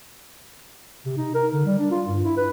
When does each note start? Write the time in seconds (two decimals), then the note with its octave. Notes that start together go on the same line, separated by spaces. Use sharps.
1.05 C3
1.17 D#4
1.34 A#4
1.53 D3
1.66 G3
1.79 D4
1.91 F4
2.07 G2
2.24 E4
2.37 B4